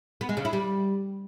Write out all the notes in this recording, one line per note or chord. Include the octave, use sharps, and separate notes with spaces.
B3
G#3
C#3
E4
G3